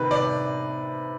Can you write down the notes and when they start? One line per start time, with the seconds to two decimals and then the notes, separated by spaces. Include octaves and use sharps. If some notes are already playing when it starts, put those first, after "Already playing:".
Already playing: C3 D#3 B4
0.11 D5